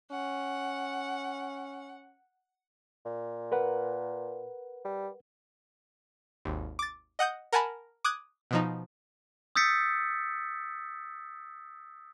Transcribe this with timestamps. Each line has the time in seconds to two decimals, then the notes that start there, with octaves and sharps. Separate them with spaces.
0.11 C#4 F#5
3.06 A#2
3.52 A#4 B4 F#5
4.85 G3
6.45 G#1 D#2
6.79 D6 A6
7.19 D#5 F#5 D#6 G6
7.53 A#4 F#5 G#5 A5 B5
8.04 D6 D#6 F#6 G#6
8.51 B2 F3 D#4
9.56 D#6 E6 G6 A6 B6 C#7